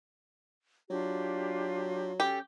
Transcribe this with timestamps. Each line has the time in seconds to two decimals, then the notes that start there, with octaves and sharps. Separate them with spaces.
0.90 F#3 D4 F4 G4
2.20 C#4 G4 A4